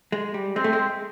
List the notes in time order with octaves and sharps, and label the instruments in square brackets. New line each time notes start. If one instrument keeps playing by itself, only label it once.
[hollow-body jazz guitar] G#3
G3
[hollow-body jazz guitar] G#3 [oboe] C4
[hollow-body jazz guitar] A3
G#3